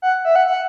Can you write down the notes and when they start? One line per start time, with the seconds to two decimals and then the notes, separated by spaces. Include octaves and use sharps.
0.02 F#5
0.25 E5
0.36 F#5
0.47 F#5